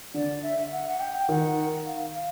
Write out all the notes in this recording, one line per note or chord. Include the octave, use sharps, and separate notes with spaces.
D3 D5
E5
F#5
F#5
G5
D#3 F#5
F5
F5